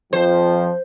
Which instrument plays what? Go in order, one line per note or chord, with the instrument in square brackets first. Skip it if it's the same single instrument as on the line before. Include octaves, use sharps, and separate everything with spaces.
[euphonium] F2 [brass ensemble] F3 [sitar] C5